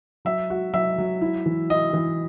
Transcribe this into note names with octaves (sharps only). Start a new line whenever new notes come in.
F#3 E5
F#4
F#3 E5
F#3
E4
E3
E4 D#5
E3